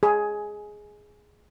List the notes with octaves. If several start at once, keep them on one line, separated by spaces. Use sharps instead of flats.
G#4